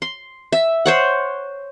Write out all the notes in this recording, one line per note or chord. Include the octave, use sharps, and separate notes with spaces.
C6
E5
C5 C#5 F#5